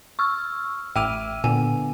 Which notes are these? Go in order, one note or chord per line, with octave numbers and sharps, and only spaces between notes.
C#6 E6 F6
A1 E5 G5 D6 E6 F6 D#7
A#2 D3 B3 G#5